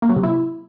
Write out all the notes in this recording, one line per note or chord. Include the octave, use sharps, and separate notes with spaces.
A#3
F#3
C3
E4